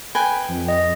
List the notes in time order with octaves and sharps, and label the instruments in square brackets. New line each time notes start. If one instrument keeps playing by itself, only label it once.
[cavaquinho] B4 G5 G#5
[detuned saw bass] F2
[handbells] D#5